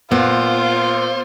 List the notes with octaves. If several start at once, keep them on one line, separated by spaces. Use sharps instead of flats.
A#2 B3 F4 C5